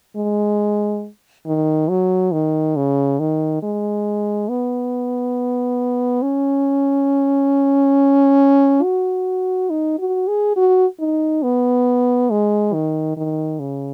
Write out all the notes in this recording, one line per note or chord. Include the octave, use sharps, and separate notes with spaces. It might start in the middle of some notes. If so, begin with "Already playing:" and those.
G#3
D#3
F#3
D#3
C#3
D#3
G#3
B3
C#4
F#4
D#4
F#4
G#4
F#4
D#4
B3
G#3
D#3
D#3
C#3